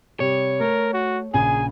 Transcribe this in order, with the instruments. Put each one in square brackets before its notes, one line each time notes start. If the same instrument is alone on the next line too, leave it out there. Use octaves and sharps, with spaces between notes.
[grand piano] C3 G3 [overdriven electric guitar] C#5
[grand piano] A3 [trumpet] A#4
[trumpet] F#4
[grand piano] A#1 C#3 [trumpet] G#4 [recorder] G#5